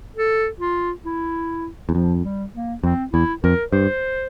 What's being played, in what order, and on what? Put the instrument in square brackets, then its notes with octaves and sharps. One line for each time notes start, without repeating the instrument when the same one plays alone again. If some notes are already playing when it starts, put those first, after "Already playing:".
[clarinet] A4
F4
E4
[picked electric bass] E2
[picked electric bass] F2 [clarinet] F3
[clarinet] G3
A#3
[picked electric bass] F2 [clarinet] C4
[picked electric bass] E2 [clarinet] E4
[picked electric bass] F2 [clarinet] A#4
[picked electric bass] G2 [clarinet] C5